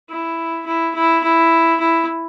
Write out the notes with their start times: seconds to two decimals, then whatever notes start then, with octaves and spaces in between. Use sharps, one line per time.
0.10 E4
0.66 E4
0.95 E4
1.23 E4
1.79 E4